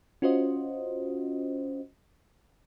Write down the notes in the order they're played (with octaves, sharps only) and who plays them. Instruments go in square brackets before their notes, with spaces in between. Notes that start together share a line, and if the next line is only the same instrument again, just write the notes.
[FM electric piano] C#4 F4 F#4 C5 D#5